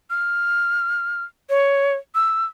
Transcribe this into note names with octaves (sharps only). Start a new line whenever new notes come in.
F6
C#5
E6